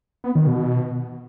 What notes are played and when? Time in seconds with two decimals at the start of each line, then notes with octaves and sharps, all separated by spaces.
0.24 B3
0.35 D#3
0.47 B2